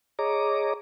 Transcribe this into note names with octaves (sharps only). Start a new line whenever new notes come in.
G#4 C#5 D#5 A#5 D6